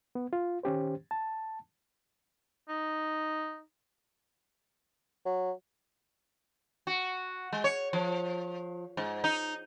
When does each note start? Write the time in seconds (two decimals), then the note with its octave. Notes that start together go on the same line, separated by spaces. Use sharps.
0.15 B3
0.33 F4
0.63 D#3 C#4 G4 C5
1.11 A5
2.69 D#4
5.25 F#3
6.87 F#4
7.53 G#3
7.64 C#5
7.93 F3
8.97 G#2
9.24 D#4